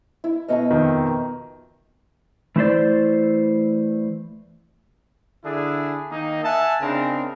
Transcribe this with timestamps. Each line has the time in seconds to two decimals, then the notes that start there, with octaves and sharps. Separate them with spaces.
0.24 E4
0.48 B2 D#5 E5 A#5 F6
0.71 F2 D#3
2.56 E3 A3 E4 C5 D5
5.45 D3 D4 E4 G#4
6.11 D#3 A#3 D#4
6.44 E5 F#5 G#5 A5
6.82 C#3 C4 D4 D#4 A#4